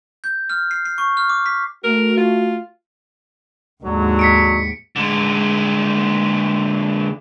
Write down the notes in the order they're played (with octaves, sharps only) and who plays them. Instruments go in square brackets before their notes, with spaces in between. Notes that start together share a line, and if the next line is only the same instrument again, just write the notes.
[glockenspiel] G6
F6
C7
C7
C#6
F6
D6
B6
[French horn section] A3 F#4 [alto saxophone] A#4
[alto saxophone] F4
[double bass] D#2 G#2 [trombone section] D3 F#3
[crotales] B6 C#7 D7
[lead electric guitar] D3 G#3